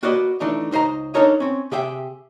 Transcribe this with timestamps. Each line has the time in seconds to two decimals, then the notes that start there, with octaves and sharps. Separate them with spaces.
0.03 A#3 F#4 B4 D5 D#5
0.40 E3 A3 D4 D#4
0.71 C#2 D#4 C5 D#5 A#5
1.14 D4 D#4 A4 A#4 C#5 D#5
1.40 C4 C#4
1.71 C3 G4 G#4 E5 G5